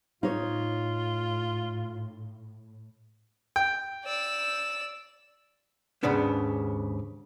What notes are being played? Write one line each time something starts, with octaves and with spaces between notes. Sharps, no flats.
A2 D#4 F4 C#5
G5
D5 E6
D#2 G#2 C#3 B3 D4